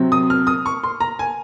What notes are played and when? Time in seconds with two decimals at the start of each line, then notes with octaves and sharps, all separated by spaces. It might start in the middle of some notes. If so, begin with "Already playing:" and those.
Already playing: C3 F#3 C4
0.12 D#6
0.30 F6
0.47 D#6
0.66 C#6
0.83 C6
1.00 A#5
1.19 G#5